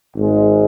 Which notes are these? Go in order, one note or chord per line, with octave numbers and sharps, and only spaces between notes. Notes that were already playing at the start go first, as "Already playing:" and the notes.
G#1 G#2 G#3